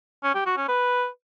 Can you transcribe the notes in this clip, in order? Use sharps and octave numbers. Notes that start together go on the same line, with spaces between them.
C#4
G4
F#4
C#4
B4